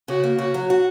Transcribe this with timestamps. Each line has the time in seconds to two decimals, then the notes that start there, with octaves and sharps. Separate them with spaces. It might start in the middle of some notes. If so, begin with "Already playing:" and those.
0.08 C#3 F#4
0.24 A#3
0.39 C#3 F#4
0.54 F#3
0.70 F#4